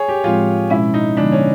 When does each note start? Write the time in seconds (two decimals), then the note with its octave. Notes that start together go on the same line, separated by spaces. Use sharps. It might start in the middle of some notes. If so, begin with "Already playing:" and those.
Already playing: G#4 C#5
0.08 G4
0.23 A2 F3 G#3 C4 F4
0.70 B2 G#3 C#4 E4
0.94 D#4
1.17 D3 F3 G#3 B3 D4
1.32 C#4